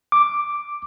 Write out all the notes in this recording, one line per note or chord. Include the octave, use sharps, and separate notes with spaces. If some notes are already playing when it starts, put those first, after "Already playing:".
D6